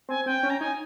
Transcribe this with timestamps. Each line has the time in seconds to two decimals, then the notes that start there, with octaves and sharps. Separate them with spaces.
0.09 C4 G#5
0.26 C4 G5
0.43 C#4
0.50 A#5
0.60 D#4 G#5